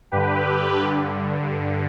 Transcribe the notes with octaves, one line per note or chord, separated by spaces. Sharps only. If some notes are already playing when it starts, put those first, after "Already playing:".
G2 D3 G4 B4
G2 D3